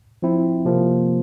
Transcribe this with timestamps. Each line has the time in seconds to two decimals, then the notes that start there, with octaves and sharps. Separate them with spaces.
0.22 F3 C4 E4
0.65 C3 F3 A#3